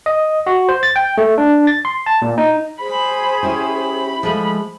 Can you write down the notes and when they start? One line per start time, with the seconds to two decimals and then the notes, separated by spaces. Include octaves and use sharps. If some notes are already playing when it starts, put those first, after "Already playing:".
0.06 D#5
0.47 F#4
0.69 C5
0.83 A6
0.96 G5
1.18 A3
1.38 D4
1.67 A6
1.85 C6
2.06 A5
2.22 A#2
2.38 D#4
2.81 G#4 C5 B5
3.43 C#4 E4 G4 B5
4.23 F3 G#3 A3